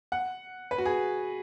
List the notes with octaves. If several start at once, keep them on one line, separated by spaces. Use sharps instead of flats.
F#5
B4
F#4
G#4